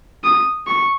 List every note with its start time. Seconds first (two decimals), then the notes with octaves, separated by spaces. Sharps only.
0.24 D#6
0.67 C#6